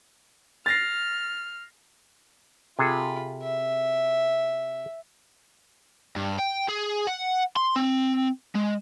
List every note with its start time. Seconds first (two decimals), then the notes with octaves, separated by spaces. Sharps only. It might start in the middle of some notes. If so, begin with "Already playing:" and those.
0.66 F6 A6 A#6 C7
2.79 C3 F4 G#4 A4 B5
3.43 E5
6.16 G2
6.39 G5
6.69 G#4
7.07 F#5
7.56 C6
7.76 C4
8.55 G#3